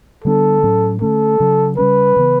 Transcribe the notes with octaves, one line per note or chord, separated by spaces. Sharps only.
D3 G3 B3 D4 A4
A2 F#3 C#4
D3 A3 C#4 A4
C#3 F#3 C#4
C#3 G3 C#4 B4
C#3 E3 B3